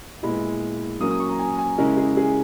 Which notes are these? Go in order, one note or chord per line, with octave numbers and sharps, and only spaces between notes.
A#2 G#3 B3 E4 B5
F#3 A#3 C#4 D#6
D#6
C#6
A#5
G#5
G#5
C#3 G#3 C#4 E4 A#4
G#4
G#4